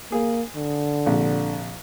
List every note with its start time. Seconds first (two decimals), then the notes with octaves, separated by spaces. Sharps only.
0.12 A#3 G#4
0.56 D3
1.06 A#1 C3